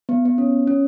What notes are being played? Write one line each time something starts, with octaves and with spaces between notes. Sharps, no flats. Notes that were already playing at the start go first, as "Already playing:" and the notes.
B3
B3
C#4
C#4